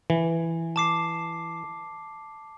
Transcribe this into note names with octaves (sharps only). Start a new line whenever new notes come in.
E3
A5 D6 C7